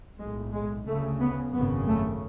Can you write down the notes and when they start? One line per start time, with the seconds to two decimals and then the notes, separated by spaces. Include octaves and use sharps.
0.18 B1 A2 G#3
0.53 G#3
0.86 D2 C#3 A3
1.20 B3
1.53 G#1 F#2 C#3 B3
1.87 A3